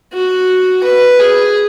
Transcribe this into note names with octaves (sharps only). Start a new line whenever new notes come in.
F#4
B4
G#4